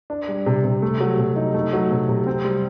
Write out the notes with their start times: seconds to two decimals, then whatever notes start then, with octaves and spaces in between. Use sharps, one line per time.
0.10 D4
0.28 G3
0.46 C3
0.64 C3
0.82 A3
1.01 F#3
1.18 C3
1.36 D#4
1.54 A3
1.73 F#3
1.91 C3
2.09 C3
2.26 C4
2.45 G3